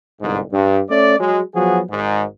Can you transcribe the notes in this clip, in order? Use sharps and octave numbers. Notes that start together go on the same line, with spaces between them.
G1 C2 G#2
G2
A3 C#4 D5
F#3 G#3
F3 F#3 B3 F#4 G#4
G#1 G#2